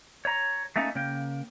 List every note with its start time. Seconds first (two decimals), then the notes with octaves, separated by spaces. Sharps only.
0.25 C#5 A#5
0.76 A3 A#3 C#4 D#4
0.95 C#3 A#3 G5